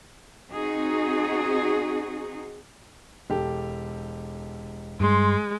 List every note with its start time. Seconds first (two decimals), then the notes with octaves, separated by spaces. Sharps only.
0.51 C4 D#4 F#4 G#4
3.30 E1 G4 A4
5.00 G2 G#3 C6